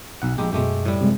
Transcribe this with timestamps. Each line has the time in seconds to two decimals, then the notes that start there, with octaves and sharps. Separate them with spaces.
0.22 B1 F#5
0.38 A#1 G#3 G4
0.53 F#2 B2 G#3 A3 G4
0.86 A2 G3
1.01 C3 G#3